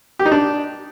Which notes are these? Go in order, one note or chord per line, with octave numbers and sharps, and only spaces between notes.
G4
D#4
D4